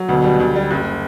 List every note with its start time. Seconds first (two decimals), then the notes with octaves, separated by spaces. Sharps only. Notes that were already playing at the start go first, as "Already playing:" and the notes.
Already playing: F#3
0.09 D2 B2
0.24 G3
0.40 D2
0.56 G3
0.71 F#1